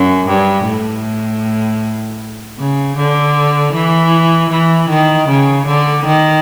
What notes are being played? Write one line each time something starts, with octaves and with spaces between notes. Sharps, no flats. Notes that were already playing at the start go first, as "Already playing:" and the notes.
Already playing: F#2
G2
A2
C#3
D3
E3
E3
D#3
C#3
D3
D#3